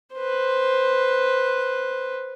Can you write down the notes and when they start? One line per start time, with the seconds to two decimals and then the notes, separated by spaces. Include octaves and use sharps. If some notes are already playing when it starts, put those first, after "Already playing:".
0.14 B4 C5